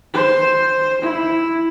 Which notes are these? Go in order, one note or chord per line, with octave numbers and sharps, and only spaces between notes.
C5
E4